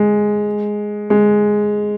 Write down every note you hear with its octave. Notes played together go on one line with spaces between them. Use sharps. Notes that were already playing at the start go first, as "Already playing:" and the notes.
Already playing: G#3
G#3